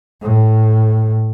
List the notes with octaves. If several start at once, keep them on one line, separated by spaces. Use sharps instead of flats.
A2